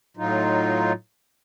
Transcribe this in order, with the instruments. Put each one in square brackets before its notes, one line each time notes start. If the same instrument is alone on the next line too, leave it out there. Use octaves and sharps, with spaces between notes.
[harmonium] A2 F#3 D#4 F4